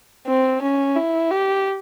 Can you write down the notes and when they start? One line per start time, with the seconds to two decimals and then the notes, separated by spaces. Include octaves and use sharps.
0.27 C4
0.62 C#4
0.96 E4
1.31 G4